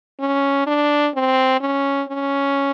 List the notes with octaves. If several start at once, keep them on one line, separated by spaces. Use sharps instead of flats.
C#4
D4
C4
C#4
C#4